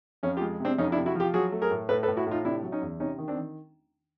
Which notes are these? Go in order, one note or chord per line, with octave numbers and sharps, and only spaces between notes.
F2 C#4
F4 G4
G#3
C3
C4 D4
F2 C#4 D#4
D4 E4
C3
E4 F#4
F3 F4 G4
F#3 F#4 G#4
A3
G#4 A#4
A2
A2 A4 B4
A4 B4
A2
E4 F#4
A2 D#4 F4
C3 D4 E4
F#3
C#4 D#4
E2
C3 C#4 D#4
D#3
C4 D4
D#3